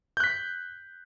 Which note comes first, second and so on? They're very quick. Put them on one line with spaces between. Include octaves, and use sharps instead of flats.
G6 F#6 B6